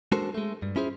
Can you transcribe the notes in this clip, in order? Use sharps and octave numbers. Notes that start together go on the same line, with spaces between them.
G#3 D4 F#4 A4 A#4 C5
G#3 A3
G2
C#4 E4 F4 G#4 C5